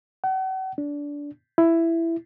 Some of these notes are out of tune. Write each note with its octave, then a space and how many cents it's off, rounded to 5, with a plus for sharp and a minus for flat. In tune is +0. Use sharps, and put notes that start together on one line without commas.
F#5 +40
D4 -20
E4 +10